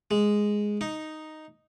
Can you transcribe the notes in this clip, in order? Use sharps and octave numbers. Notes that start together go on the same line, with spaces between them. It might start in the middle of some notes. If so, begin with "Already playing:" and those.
G#3
D#4